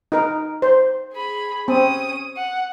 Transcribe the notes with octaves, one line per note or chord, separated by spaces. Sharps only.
D#4 A#4
C5
G#4 B5
C4 C#4 D#6
F#5